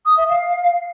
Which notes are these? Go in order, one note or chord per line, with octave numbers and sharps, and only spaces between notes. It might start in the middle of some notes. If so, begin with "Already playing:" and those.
D#6
E5
F5